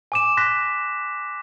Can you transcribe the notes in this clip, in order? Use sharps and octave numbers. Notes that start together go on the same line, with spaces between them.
G#5 D6 E7
C6 F#6 A#6 B6